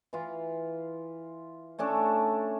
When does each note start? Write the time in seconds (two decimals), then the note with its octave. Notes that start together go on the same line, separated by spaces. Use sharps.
0.13 E3 F4
1.79 A3 C#4 D4 A4